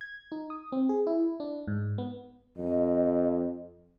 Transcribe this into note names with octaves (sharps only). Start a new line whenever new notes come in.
G#6
D#4
D#6
C4
G#4
E4
D4
G#2
B3
F2 D#5